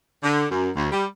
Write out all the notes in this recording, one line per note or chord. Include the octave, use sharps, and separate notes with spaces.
D3
F#2
D2
G3